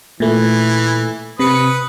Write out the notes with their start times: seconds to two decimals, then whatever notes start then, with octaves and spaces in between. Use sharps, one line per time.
0.20 A#2 E3 A3
1.39 C3 B4 D#6 C#7